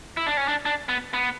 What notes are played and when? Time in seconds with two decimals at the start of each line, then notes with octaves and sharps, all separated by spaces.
0.17 E4
0.27 D4
0.37 C#4
0.48 D4
0.65 D4
0.89 B3
1.14 B3